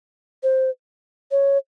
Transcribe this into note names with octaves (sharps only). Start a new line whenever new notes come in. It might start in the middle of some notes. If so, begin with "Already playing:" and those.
C5
C#5